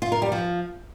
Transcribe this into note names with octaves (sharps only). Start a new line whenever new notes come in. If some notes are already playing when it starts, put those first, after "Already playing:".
F4
A#4
G3
F3